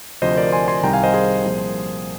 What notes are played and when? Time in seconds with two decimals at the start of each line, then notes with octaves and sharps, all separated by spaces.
0.22 D2 C3 F3 C5 D#5
0.37 A#4 D5
0.52 G#5 C6
0.68 G#5 C6
0.83 C2 C3 D#3 G3 G5 A#5
0.93 F5 G#5
1.03 C5 D#5
1.14 G#4 C5
1.44 C2 A#2 F3